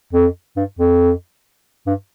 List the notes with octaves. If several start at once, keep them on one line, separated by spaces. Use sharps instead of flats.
F2
G2
F2
G2